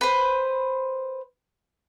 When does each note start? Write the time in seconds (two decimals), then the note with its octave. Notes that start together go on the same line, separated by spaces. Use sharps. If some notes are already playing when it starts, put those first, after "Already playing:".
0.01 B4 C5